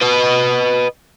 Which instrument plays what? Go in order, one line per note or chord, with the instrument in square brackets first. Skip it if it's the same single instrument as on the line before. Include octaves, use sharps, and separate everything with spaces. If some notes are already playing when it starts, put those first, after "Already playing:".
[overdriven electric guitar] B4 D#5